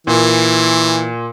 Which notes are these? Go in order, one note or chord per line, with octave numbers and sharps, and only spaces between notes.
A#2 E3